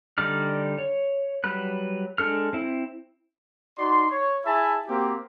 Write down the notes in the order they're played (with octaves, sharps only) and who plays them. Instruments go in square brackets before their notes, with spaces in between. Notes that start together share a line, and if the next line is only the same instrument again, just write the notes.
[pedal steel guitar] D3 G3 D#4 D5 F6
C#5
F#3 G3 B4 F#6
G#3 D4 A4 F6
C4 E4
[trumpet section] D#4 F#4 D5 C6
C#5
E4 G#4 E5 G#5 A5 B5
A#3 C4 F#4 G4